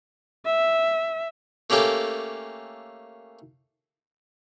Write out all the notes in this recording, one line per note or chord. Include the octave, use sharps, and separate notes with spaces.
E5
A3 A#3 C#4 G4 A4